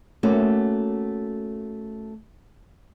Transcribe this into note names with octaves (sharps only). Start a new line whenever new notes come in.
A3 A#3 C#4 F#4